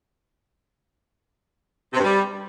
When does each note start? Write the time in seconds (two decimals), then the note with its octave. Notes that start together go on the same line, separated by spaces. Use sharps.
1.93 C3
1.99 G2
2.04 G3